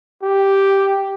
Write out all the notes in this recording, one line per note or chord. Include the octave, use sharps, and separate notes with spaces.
G4